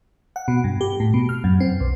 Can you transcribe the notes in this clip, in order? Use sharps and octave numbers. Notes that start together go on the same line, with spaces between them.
F#5
B2
G2
G4
A2
B2
F6
F#2
C4
B1